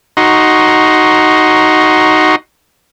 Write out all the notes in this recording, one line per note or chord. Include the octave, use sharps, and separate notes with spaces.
D#4 F#4 A#5 C6 C#6